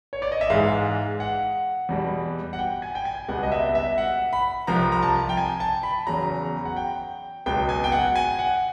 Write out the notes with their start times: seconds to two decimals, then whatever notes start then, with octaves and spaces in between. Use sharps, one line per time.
0.13 C#5
0.22 D5
0.32 D#5
0.41 E5
0.50 G#2 E3 G#3 F5
1.20 F#5
1.89 E2 B2 G3
2.53 F#5
2.59 G5
2.82 G#5
2.95 G5
3.05 G#5
3.28 C#2 B2 G3 F#5
3.43 D#5
3.52 E5
3.75 E5
3.98 F#5
4.33 B5
4.67 C2 C3 F3 A#5
4.92 A#5
5.02 A5
5.29 G5
5.37 G#5
5.60 A5
5.83 B5
6.07 E2 C#3 F#3 A#5
6.65 F#5
6.76 G5
7.46 C#2 B2 F#3 G5
7.69 G#5
7.84 G5
7.92 F#5
8.16 G#5
8.39 F#5